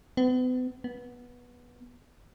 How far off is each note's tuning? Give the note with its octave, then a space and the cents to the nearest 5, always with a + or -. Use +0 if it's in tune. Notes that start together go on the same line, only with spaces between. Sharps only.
B3 +40
B3 -15